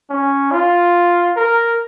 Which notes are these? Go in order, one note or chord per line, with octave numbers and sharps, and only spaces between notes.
C#4
F4
A#4